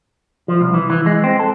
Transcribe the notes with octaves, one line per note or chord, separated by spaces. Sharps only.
F3
C2
E3
E3
G#3
C4
A4